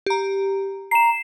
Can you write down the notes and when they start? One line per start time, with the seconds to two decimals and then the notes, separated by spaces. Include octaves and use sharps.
0.06 G4 A#5
0.91 A#5 C7 E7